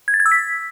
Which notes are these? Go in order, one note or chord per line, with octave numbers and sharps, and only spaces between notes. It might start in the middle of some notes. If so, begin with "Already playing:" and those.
G#6
A6
G#6
E6
B6